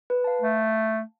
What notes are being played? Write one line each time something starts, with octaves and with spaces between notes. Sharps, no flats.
B4
F5 A5
A3